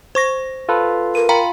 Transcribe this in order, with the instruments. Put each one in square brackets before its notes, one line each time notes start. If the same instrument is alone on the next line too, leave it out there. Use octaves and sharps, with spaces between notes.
[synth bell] C5 C#6 A#6
[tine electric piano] F4 A4 B4
[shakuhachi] A#4 [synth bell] D#7
[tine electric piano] F4 B5 [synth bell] F5 G5 A#5